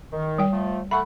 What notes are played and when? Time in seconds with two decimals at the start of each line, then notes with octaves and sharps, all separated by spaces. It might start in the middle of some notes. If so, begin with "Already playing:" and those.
0.12 D#3
0.38 G3 G5
0.52 F3 A3
0.91 A3 F#5 B5 C#6